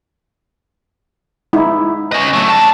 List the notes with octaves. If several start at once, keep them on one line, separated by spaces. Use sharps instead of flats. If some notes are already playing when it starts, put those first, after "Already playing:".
G#3 D#4 E4
C#4 D#5
F#3 A3
G3 A5